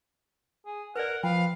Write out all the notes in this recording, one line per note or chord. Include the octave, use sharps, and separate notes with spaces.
G#4
A#4 B4 D5 F#5
F3 B4 F5 G5